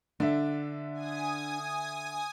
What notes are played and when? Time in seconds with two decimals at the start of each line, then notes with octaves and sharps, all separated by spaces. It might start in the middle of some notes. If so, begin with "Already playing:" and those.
0.20 D3 D4 E5
0.94 G#5 D#6